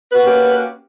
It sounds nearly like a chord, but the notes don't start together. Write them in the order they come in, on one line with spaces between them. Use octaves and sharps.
B4 F#4 A#3 C#4 G4